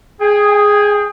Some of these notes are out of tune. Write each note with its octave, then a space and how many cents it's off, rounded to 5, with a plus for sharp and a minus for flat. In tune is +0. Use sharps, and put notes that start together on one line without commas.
G#4 +0 G5 +30